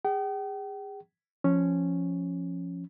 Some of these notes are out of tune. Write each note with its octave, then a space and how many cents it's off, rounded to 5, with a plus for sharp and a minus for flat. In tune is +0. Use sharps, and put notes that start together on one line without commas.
G#4 -35 G5 -40
F3 -5 C#4 -5